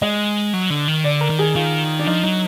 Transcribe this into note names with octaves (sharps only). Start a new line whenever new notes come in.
G#3 D#5
F#3
D3
D#3
D3 D5
A#4
D#3
G#4
D#3 F4
D4
F3 D#4
F#3 D#4